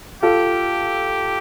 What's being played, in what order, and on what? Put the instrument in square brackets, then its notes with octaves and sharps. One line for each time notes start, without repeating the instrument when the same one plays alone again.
[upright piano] F4 A4 [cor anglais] G4